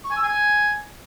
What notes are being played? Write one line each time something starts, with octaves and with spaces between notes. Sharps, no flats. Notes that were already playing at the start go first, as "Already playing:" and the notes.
C#6
G#5
E6
G#5